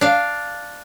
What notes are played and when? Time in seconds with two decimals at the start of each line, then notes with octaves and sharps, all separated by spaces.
0.01 D4 F5